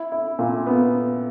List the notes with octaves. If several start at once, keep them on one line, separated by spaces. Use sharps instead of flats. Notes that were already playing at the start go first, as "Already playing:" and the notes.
Already playing: E4
E4
A#2
B3